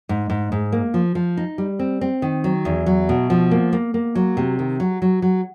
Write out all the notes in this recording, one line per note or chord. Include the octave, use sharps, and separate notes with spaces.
G#2
G#2
G#2
A#3
F3
F3
D#4
G3
C4
C4
D#3
F#3
E2
F#3
B2
F3
A#3
A#3
A#3
F#3
C3
D#3
F#3
F#3
F#3